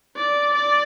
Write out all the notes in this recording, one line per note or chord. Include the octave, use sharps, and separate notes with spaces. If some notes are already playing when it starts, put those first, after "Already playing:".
D5
D5